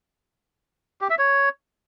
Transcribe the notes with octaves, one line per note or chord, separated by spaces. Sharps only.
G4
E5
C#5